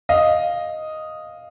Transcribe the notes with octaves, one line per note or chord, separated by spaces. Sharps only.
D#5 F5